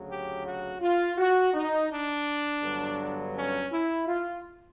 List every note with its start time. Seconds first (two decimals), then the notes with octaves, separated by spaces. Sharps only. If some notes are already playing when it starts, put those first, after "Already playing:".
Already playing: D2 C#3 F#3
0.09 G4
0.45 F#4
0.81 F4
1.18 F#4
1.54 D#4
1.90 D4
2.63 G2 D3 F#3 B3
3.35 C#4
3.72 E4
4.07 F4